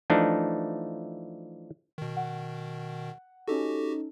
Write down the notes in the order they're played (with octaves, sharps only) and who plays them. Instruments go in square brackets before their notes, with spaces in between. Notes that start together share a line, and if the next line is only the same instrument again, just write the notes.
[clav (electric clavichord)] E3 F3 A3 D4 D#4
[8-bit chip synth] B2 D#3
[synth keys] F#5
[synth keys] C#4 D#4 A4 [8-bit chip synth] F#4 G4